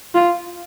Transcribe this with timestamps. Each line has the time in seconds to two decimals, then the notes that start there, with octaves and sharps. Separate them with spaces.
0.14 F4